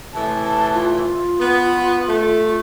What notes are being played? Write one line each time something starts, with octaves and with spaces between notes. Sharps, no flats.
A2 C3 E3 A5
A5
F4
B3
A3